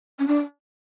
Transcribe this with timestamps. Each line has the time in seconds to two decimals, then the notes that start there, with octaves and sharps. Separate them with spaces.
0.19 C#4
0.28 D4